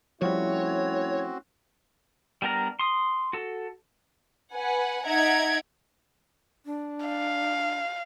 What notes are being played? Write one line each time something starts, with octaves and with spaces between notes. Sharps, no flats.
F3 G3 A3 C4 C#4 E4 F#4 C#5
G3 B3 D4 A#4 A#5
C6 D#6
F#4 A4
B4 F#5 G#5
D#4 E5 F#5 A#5 G#6 D7
D4
F5